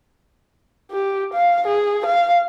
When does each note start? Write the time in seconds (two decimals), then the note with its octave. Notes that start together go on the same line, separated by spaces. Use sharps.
0.91 G4
1.34 F5
1.67 G#4
2.06 F5